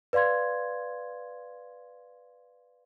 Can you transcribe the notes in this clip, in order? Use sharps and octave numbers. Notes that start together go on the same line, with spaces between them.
B4 D5 F5 C6 G#6